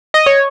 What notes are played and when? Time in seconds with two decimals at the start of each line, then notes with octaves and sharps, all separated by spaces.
0.14 D#5
0.26 C#5